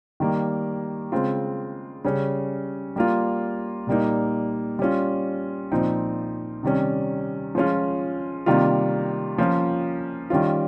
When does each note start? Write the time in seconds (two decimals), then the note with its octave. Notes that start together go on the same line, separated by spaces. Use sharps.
0.20 D#3 G3 A#3
1.12 C#3 G#3 C4 F4
2.04 C#3 G3 C#4
2.96 G3 A#3 F4
3.87 A#2 G3 A#3 D#4
4.79 G3 C#4 F4
5.72 A#2 F3 C4 D#4
6.63 C3 D#3 G3 C#4
7.55 F3 G#3 C#4 F4
8.46 C3 D#3 G3 A#3 F4
9.38 F3 A#3 C#4 F4
10.30 D#3 G3 C#4 F4